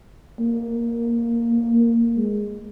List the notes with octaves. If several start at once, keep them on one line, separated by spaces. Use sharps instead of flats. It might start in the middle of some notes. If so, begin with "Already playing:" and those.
A#3
G#3